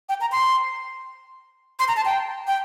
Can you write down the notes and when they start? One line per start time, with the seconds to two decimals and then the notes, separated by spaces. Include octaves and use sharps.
0.09 G5
0.21 A#5
0.32 C6
1.79 C6
1.88 A#5
1.97 A5
2.05 G5
2.47 G5